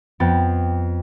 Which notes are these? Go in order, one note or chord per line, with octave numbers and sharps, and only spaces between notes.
F2 B3 G5 A6